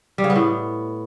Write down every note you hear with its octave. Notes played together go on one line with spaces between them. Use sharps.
G3
C#3
B3
A2